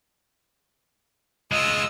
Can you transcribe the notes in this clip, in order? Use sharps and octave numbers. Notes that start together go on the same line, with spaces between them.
G#3 F4 D#5 E6